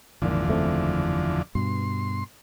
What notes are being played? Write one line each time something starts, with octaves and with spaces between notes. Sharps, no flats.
G#1 E2 A#2 D3 F3
F#1 A3 C4
G2 B2 C6